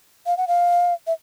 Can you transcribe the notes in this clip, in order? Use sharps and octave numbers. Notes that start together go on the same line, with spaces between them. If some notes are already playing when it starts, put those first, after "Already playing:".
F5
F#5
F5
E5